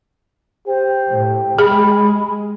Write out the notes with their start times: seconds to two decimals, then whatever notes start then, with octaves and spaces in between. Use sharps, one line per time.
0.67 G4 C5
1.09 A2
1.58 G#3 G#4 B5